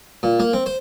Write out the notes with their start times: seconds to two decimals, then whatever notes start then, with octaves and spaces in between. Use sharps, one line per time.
0.23 A#2
0.40 A#3
0.53 C4
0.66 C5